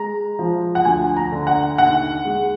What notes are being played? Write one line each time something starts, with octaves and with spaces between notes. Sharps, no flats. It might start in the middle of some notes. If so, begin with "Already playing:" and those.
Already playing: G#3 A#5
F3
F#5
D2 G#5
A#5
D3
F#5
D#2 F#5
G#3